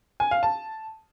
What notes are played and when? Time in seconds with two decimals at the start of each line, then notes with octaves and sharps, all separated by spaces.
0.20 G#5
0.31 F5
0.43 A5